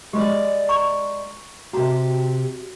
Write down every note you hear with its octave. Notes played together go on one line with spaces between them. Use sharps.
G#3 G4 D5 B5
A#5 C#6
C3 F#4 G4 A#5